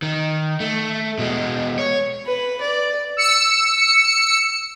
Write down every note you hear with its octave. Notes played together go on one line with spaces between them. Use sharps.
D#3
A3
B2 G#3
C#5
B4
D5
E6 C#7